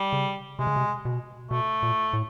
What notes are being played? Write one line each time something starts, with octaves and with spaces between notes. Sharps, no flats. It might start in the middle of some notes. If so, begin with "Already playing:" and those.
Already playing: G3
C#3
C3 G#3
C#3
C3
B2
B2 A3
A#2
A2